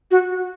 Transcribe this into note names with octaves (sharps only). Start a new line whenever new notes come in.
F#4